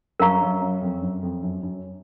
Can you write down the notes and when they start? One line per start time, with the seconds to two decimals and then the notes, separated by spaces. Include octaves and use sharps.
0.20 F#2 A#4 F5 A#5 C#6
0.41 F#2
0.62 F#2
0.81 F2
1.02 F#2
1.23 F2
1.43 F#2
1.63 F#2